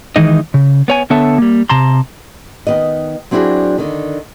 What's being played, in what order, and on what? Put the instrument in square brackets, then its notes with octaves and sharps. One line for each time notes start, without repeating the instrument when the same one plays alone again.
[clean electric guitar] D#3 E3 G#3 D#4 D#5
C#3
B3 C#5 G#5
D3 B3 A4 C#5 E5 A5
G3 A#3
C3 A5 A#5 C6
[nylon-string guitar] D#3 B3 D#5
F#3 C4 D4 E4 F#4 G#4
D3 D#3